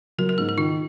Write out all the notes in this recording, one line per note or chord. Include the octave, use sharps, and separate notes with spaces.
F#3 A#4
A#4
G#2 G#4
G#4
D#3 F4